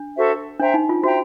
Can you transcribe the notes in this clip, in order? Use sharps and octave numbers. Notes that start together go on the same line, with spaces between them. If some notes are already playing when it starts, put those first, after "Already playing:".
Already playing: D4
F#4 A4 C5 E5
D4 C5 E5 G5 A#5
D#4
F4
F#4 C5 E5 G5 A#5